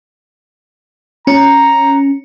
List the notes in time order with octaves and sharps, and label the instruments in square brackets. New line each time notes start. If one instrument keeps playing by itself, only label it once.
[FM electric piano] C#4 [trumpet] A#5